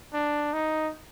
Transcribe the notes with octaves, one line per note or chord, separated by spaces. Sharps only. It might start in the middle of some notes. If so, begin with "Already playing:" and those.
D4
D#4